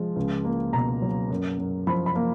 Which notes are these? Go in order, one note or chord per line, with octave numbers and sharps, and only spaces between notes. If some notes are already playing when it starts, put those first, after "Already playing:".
Already playing: F3 G#3
C#2
A#3
B2 A#5
F#3
F#2
F#2
F3 B5
B5
A#3